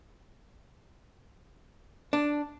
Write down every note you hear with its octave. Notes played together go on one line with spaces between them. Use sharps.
D4